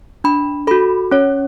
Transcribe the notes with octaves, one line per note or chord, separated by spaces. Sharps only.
D4 B5
F#4 A4 B5
C#4 C#5